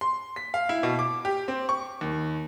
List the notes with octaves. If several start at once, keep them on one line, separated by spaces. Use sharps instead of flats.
C6
B6
F5
E4
B2
D6
G4
C4
C#6
D#2